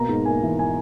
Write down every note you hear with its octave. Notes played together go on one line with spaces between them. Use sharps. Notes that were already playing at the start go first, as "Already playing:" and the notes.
Already playing: B2 A#3 A#5
G#2
A#3 G#5
E3
G#5